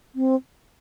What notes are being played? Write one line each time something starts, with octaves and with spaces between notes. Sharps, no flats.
C4